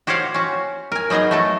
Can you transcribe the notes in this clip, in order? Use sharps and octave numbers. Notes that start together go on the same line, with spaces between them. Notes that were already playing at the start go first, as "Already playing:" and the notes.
F#4 G4 C5 C#5 F5 F#5
C#4 F#4
A#4 G#5
F#3 B3 D#4 G#4 D#5
A3 F#4 A4